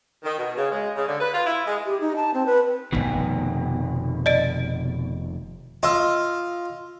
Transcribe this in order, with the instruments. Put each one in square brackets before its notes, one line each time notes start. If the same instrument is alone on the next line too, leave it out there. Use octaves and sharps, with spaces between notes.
[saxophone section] D#3
B2
C#3
G#3
C#3
D3
B4
F4
E4
G#3
[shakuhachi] G4
D#4
A5
C4
B4
[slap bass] F1 C2 D#3 [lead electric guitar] B2
[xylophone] D5 D#5 D7
[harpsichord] F4 [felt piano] D#5 E6